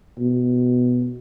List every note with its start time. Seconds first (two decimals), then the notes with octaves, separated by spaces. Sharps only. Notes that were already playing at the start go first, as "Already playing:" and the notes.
0.19 B2